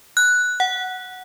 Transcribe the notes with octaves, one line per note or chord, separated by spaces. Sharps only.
F#6
F#5